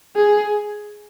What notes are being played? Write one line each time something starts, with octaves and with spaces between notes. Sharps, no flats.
G#4